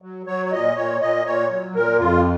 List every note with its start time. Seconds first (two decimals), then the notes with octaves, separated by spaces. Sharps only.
0.02 F#3
0.26 F#3 C#5
0.46 C#5
0.52 A#2 D#5
0.76 A#2 C#5
1.01 A#2 D#5
1.25 A#2 C#5
1.49 F#3
1.74 A#2 A#4
1.99 F2 F4